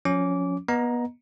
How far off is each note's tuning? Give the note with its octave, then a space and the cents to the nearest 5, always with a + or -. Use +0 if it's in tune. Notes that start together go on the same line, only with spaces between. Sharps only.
F3 +35 C#4 +10 D6 -20
B3 -25 D#5 +0 A#5 +10